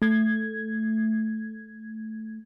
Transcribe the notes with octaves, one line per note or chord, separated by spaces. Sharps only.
A3 G#6